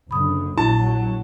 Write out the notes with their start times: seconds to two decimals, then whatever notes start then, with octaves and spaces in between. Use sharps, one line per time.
0.11 F#1 D3 B5 D#6
0.58 A#1 F#3 E4 A5